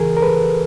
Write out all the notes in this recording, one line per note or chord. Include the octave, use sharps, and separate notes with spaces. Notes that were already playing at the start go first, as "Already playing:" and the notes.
Already playing: C#3 E3 G#4 A#4
A#4
A4 B4